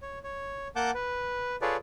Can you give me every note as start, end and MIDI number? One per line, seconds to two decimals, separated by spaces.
0.02 0.19 73
0.24 0.68 73
0.76 0.91 58
0.76 0.91 78
0.76 0.91 81
0.76 0.91 86
0.76 0.91 91
0.94 1.56 71
1.62 1.76 65
1.62 1.76 68
1.62 1.76 69
1.62 1.76 71
1.62 1.76 73
1.62 1.76 74